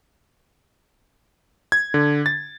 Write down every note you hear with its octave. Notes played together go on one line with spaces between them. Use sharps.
G#6
D3
A6